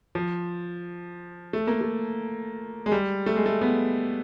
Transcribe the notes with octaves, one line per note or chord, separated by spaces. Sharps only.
F3
A3
A#3
A3
G#3
G3
A3
G#3
A3
B3